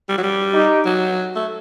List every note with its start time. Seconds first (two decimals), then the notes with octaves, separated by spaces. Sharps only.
0.09 G3
0.18 F#3
0.23 G3
0.54 D#4 G4
0.85 F#3
1.36 A3